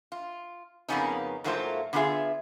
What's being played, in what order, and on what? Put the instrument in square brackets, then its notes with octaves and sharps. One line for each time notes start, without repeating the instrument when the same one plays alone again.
[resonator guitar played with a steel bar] F4
F2 C#3 A#3 B3 C#4 D#4
G#2 F#3 A3 A#3 F4 C5
D3 B3 D4 F4 G#4 E5